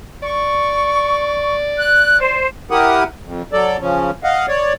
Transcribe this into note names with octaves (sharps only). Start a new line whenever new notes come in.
D5 C#6
F#6
C5
E4 G4 A#4 F#5 D#6
F2
F#3 A4 D5
C#3 F3 C#4
D#5 F5 F#5
C#5 D5